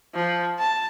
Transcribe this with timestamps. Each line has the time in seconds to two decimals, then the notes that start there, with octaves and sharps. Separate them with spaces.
0.15 F3
0.59 A5